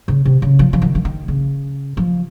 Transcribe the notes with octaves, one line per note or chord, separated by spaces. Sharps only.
C#3
C3
C#3
F3
F3
D#3
F3
D#3
C#3
F3